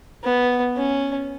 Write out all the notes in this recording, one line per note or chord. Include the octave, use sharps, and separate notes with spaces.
B3
C#4